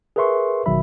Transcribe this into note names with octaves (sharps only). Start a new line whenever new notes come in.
G#4 A#4 B4 E5 C6 C#6
G1 B2 D#3 F#3 E5 B5